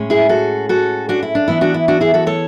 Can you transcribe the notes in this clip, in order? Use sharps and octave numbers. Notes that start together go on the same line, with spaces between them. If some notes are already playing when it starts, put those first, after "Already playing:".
Already playing: A2 G#3 C#4
E4 G#4
F#4 A4
F#4 A4
D4 F#4
E4
D4
E3 B3 D4 E4
D4 F#4
E4
D4 F#4
E4 G#4
F#4 A4
A4 C#5